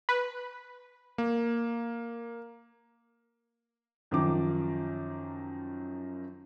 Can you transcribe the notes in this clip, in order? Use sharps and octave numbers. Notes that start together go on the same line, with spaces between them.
B4
A#3
F#2 D#3 F3 D6